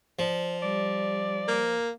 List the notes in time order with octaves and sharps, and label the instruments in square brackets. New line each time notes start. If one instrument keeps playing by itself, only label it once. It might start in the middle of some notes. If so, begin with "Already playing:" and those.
[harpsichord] F3 [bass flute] D5
[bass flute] G3 [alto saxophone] D5
[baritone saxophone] A#3